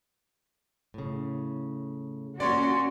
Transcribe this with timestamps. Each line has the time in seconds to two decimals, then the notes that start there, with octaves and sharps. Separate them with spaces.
0.94 A2 C#3
2.40 A#2 A#3 C#4 F#4 C#5 D5 C6